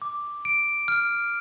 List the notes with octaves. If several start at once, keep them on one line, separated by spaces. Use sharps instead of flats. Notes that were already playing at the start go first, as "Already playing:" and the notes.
D6
D7
F6